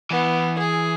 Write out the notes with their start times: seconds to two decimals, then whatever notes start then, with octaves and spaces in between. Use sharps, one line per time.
0.11 E3 B3
0.58 G#4